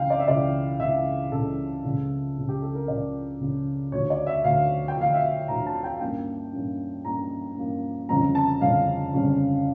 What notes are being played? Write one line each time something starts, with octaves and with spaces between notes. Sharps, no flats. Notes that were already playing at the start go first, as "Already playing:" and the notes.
Already playing: C#2 C#3 E3 F5 G5
D5
E5
C#2 C#3 E3 D5
C#2 C#3 E3 E5
C#2 C#3 E3 A4
C#2 C#3 F3
C#2 C#3 F3
G4
A4
A#4
C#2 C#3 F3 D5
C#2 C#3 F3
D2 D3 F3 C#5
D5
E5
D2 D3 F3 F5
G5
D2 D3 F3 F5
E5
D2 D3 F3 A#5
A5
G5
G2 F3 A#3 C#4 G5
G2 F3 A#3 C#4
G2 F3 A#3 C#4 A#5
G2 F3 A#3 C#4
G1 F2 C#3 F3 C#4 A#5
A5
G1 F2 C#3 F3 C#4 F5
G1 F2 C#3 F3 C#4